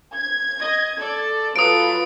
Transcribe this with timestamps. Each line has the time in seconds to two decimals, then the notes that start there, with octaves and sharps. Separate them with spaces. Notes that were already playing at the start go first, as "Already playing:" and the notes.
0.15 G#6
0.59 D#5
0.98 A4 D5
1.56 F#3 F4 A4 B4 D#6 D7